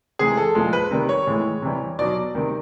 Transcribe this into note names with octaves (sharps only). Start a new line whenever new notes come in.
C3 E3 G#3 G#4
A4
A#2 F3 G#3
B4
C3 D#3 G3
C#5
A2 E3 G#3
C3 E3 G3
B2 F#3 D5
C3 D#3 G3